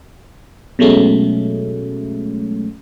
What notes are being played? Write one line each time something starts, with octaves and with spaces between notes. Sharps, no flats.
B2 F#3 G#3 A3 C#4